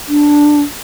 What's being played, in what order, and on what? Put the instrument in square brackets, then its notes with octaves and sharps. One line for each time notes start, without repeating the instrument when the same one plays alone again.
[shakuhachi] D4